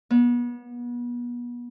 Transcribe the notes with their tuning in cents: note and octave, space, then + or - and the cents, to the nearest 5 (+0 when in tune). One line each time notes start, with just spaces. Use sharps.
B3 -35